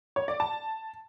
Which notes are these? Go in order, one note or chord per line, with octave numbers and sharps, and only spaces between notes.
C#5
D5
A5